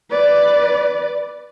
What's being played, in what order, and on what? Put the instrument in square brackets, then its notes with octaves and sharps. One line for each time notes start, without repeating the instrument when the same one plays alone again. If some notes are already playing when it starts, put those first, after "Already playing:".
[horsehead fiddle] B4 D5